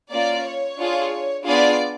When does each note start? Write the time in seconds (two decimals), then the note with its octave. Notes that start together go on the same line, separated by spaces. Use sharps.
0.12 A#3 C#4 F4 D5
0.46 C#5
0.79 D4 F4 G#4
1.46 B3 D4 F4 G#4 D5